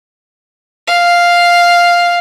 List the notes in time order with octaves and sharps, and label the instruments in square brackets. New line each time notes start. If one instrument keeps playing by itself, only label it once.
[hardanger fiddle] F5